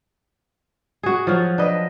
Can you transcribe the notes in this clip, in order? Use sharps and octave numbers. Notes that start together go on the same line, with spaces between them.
F#4 G#4
F3 F#3 F4 F#4
D4 B4 D#5